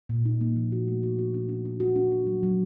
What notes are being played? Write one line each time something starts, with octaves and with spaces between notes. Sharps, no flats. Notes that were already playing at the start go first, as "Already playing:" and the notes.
A#2
D#4
A#3
F3
F#4
A3
F#4
F#4
D4
D4
D4
F#4
D4
D4
F#3
F#3